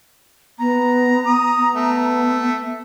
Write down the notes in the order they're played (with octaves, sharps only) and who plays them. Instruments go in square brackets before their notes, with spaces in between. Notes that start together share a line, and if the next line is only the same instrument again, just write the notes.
[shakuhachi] B3 [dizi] A#5
[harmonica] D#6
[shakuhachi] B3
[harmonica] A3